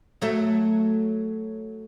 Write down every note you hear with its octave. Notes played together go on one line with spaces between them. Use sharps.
F#3 A3